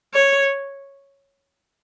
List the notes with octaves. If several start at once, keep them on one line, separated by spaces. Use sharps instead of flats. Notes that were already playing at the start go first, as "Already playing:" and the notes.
C#5